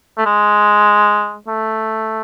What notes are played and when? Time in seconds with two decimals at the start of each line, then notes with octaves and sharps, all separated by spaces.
0.18 A3
0.25 G#3
1.48 A3